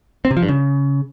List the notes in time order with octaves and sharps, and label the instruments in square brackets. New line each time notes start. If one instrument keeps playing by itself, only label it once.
[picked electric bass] C4
C3
F3
G2
C#3